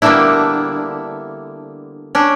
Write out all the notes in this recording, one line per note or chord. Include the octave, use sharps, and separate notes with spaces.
D3 G3 A#3 B3 D4 E4
C#4 D4